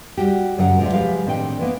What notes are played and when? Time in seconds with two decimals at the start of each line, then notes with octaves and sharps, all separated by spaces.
0.18 G3 F#4 G4
0.58 F#2 C#3 F#3 C#4 A#4 F#5
0.79 E2 C3 G#3 F4 A#4
0.93 F3 G#3 G4 B4 F5
1.26 A2 D#3 C4 D4 D#5 G5
1.59 E3 A#3 B3